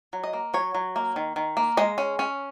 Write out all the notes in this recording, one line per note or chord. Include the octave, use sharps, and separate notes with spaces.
F#3
D#5
A#3
F#3 C#5
F#3
A#3
D#3
D#3
A#3
G#3 D#5
C#4
C#4